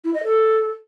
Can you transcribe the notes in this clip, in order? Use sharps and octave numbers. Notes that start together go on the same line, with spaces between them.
E4
D#5
A4